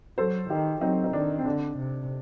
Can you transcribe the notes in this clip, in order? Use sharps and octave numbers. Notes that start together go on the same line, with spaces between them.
F#3 A4 C5
D#3 D#4 G4
F#3 C4 D#4
D#4
D#3 D4
C4
D3 D4
C3